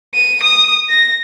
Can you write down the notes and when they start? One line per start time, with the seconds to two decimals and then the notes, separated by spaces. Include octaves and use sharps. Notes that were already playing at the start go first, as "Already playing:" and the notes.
0.14 D#7
0.43 D#6
0.89 A#6